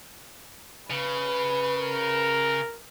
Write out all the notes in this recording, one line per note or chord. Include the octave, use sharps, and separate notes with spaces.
C#3 B4
A#4